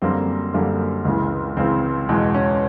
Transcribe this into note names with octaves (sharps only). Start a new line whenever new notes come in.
F#2 D3 G3 A#3 C4
F#2 D3 G3 A#3
C#2 C#3 E3
C#2 C#3 E3 C4
E2 B2 G#3
C#4